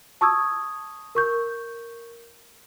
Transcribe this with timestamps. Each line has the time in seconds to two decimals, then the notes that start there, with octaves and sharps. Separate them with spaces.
0.21 A5 C#6 D#6 E6 G#6
1.15 A#4 C#6 G6